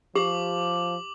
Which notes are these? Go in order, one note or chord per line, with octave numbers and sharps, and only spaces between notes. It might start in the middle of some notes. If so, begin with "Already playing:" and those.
F3 G4 D6 F#7